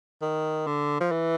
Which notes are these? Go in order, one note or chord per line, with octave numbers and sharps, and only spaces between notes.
D#3
D3
F3
E3